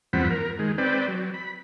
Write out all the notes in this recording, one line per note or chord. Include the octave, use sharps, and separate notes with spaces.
E2 G2 F3 C4 F#5 B5
A#4
D#3 G#3
C4 B4 D5 G5
F#3
B5